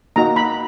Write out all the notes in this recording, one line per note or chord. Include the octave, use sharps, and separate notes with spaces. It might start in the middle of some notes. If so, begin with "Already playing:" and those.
A#3 D#4 F#4 A#5
B5